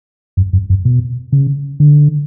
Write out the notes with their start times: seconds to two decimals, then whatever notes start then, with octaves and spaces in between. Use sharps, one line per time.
0.37 F#2
0.53 F#2
0.70 F#2
0.85 B2
1.32 C#3
1.80 D3